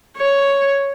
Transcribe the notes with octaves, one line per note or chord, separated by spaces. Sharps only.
C#5